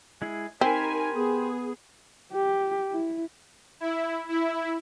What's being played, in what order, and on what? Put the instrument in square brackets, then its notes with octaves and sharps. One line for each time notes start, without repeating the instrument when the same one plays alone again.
[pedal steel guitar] G#3 E4 G#4
[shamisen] C4 [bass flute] D#4 [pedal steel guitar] G4 C5 B5 [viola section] A#4 G#5
[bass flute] B3 [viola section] G#4
[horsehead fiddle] G4
E4
[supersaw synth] E4
E4